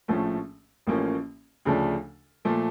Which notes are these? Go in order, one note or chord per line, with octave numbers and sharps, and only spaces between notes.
A#1 A2 F3 A3 C#4
A1 A2 F3 A#3 C#4
D2 C#3 F3 A3 D4
A#2 F3 A3